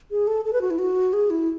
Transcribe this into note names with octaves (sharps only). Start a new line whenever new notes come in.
G#4
A4
A4
B4
F#4
E4
F#4
G#4
E4